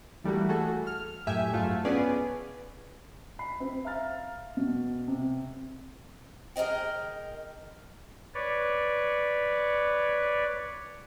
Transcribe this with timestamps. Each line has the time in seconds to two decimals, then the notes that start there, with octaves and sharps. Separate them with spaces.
0.24 E3 G3 A3 A#3 F#4
0.49 A3 F#4 G#4 A4
0.87 F6
1.27 F#2 A2 A3 G4 E5 G#5
1.52 G#2 F#3 A3 F4
1.85 B3 C#4 G#4 B4 D5
3.39 B5 C7
3.60 C4
3.85 E5 F5 A#5 F6 A6
4.57 B2
5.08 C3
6.56 G#4 A#4 D5 D#5 G5
8.34 B4 C#5 D5